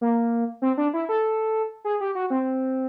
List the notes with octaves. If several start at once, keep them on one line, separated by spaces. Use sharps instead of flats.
A#3
C4
D4
E4
A4
G#4
G4
F#4
C4